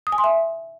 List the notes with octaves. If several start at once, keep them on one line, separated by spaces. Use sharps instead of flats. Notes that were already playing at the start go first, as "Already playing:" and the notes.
D#6
G#5
C6
E5